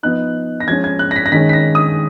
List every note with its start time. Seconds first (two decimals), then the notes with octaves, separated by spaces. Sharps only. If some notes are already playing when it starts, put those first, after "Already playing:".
0.03 F3 B3 D#4 F#6
0.60 A#6
0.68 F3 G#3 C#4 G#6
0.84 G#6
0.99 F#6
1.11 A#6
1.16 B6
1.26 A#6
1.32 D#3 G#3 C#4 B6
1.49 B6
1.53 A#6
1.75 D#6